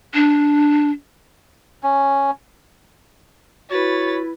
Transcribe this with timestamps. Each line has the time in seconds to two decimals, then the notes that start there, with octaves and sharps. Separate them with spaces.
0.14 D4
1.83 C#4
3.70 E4 F#4 B4 C#5 A6